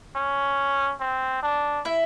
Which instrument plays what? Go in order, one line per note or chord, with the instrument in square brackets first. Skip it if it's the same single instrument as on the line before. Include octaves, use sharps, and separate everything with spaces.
[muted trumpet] C#4
C4
D4
[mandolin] E4 E5